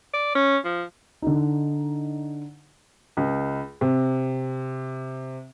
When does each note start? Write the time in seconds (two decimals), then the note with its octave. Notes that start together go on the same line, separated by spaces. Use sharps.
0.14 D5
0.35 C#4
0.65 F3
1.22 D3 D#4
3.17 C#2
3.81 C3